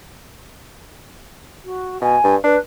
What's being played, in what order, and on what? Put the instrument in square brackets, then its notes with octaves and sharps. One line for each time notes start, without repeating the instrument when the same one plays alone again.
[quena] F#4
[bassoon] B2 [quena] G#5
[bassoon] G2
[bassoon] D4 [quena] B4